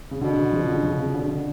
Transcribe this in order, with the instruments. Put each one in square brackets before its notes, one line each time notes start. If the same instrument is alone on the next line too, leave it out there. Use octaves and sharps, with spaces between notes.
[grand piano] C#3
[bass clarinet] B2 [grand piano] D3
[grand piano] D3
C#3 F3
D3
C#3 F3
C#3
D3
D3